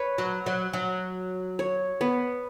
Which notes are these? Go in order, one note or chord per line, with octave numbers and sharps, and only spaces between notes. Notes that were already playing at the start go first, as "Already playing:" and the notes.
Already playing: B4 C#5
F#3
F#3
F#3
C#5
B3